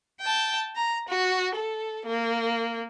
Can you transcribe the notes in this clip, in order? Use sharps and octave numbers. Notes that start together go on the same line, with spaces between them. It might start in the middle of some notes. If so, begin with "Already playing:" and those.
G5 A5
A#5
F#4
A4
A#3